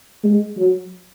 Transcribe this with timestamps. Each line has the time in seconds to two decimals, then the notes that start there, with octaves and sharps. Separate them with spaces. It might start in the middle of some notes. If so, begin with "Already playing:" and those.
0.24 G#3
0.57 F#3